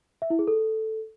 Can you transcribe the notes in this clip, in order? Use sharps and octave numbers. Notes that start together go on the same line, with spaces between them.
E5
E4
G#4
A4